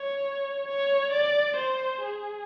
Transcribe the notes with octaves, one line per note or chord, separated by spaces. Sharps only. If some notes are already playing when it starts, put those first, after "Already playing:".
Already playing: C#5
C#5
D5
C5
G#4